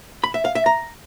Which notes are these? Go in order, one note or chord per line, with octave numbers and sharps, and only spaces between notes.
B5
E5
F5
E5
A#5